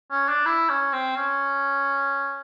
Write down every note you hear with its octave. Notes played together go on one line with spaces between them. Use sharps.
C#4
D4
E4
C#4
C4
C#4